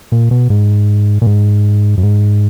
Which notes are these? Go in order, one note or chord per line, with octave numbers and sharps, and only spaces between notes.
A#2
B2
G#2
A#2
G#2
F#2
G#2